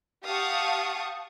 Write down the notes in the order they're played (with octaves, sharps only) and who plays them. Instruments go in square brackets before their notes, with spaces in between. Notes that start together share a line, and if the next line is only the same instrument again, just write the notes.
[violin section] G4 F5 F#5 A5 C#6 D#6